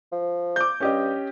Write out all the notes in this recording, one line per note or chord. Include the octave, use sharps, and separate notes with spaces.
F3
D6 G6
G2 C#4 G4 D#5